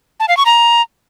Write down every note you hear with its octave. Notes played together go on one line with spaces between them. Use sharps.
A5
F5
C#6
A#5